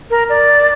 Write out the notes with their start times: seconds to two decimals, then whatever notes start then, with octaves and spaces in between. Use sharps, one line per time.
0.10 A#4
0.29 D5